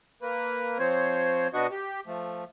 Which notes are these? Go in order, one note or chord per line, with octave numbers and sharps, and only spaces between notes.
A#3 B4
F3 C4 C5 C#5
B2 B3 D4 F#4 D#5 C#6
G4
F3 A3